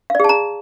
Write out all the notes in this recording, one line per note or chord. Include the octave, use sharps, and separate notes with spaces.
G#4 D5 F5 A5 A#5